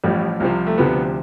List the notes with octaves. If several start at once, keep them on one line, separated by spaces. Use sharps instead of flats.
A1 A2 F3 G3
C2 C3 F3
A3
D2 C3 F3 B3